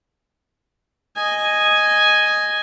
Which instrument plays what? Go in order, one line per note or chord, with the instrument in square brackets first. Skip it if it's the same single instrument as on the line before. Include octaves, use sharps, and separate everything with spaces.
[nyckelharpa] D#5 G#5